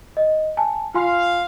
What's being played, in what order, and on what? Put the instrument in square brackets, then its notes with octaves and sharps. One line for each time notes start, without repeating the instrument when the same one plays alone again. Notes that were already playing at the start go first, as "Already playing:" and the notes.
[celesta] D#5
G#5 A5
[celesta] F4 G#5 C6 [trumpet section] F5